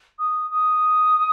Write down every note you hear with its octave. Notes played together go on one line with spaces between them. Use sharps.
D#6
D#6